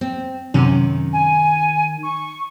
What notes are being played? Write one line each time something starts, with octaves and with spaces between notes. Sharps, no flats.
C4
F#2 C3 D#3 C#4
G#5
C#6